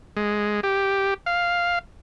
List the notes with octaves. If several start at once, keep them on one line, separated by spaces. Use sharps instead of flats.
G#3
G4
F5